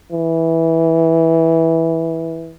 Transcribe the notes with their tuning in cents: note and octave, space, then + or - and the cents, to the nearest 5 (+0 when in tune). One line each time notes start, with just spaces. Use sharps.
E3 -10